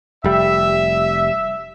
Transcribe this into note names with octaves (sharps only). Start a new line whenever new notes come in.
F1 G3 E5